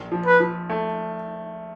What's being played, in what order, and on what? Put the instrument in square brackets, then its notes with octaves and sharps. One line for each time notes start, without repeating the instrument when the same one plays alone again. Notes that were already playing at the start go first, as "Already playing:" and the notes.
Already playing: [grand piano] A#1
F3
[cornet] B4
[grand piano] F3
A3